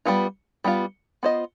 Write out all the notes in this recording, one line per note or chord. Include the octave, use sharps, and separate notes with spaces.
G3 B3 F4
G3 B3 F4
B3 F4 C5 D#5